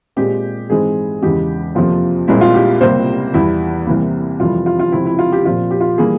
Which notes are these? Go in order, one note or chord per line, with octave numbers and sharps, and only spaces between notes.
A#2 G#3 C4 G4
G#2 E3 G#3 C4 G#4
E2 C#3 E3 G#3 G4
F2 C3 F3 A#3 F4
C2 A#2 G#3 C4 E4
F4
G4
C#2 C3 G3 A#3 C5
E2 E3 G3 E4
C2 C3 E3 A#3
F2 C3 E3 G3 F4
F4
F4
C#2 C3 F3 E4
E4
F4
G4
A#2 F3 C4 F4
G4
F4
E3 G3 A#3 G#4